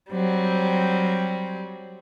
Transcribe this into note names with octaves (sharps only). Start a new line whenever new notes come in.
F#3 G3 C4